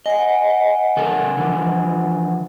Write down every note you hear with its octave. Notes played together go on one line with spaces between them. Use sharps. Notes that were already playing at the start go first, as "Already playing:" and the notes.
D#5 F#5 G#5
C#3 A4 A#4
D3 E3 F3